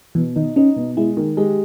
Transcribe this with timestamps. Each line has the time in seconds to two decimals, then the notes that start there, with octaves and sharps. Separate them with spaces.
0.15 B2 E3
0.36 D#3 D#4
0.56 C#4 D#4
0.76 B2
0.97 G#3 E4
1.17 D#3
1.37 G#3 G4